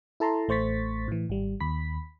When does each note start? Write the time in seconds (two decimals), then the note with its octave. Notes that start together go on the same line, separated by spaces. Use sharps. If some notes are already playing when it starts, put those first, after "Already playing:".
0.20 E4 A4 A5 A#5 C6
0.48 A1 A3 C5 C#6 A6 B6
1.08 A2 E3
1.30 G#1 G3
1.60 D#2 B5 B6